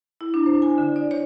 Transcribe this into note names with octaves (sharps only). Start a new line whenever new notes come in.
E4
D4
C5
G#5
D3
D5
C#5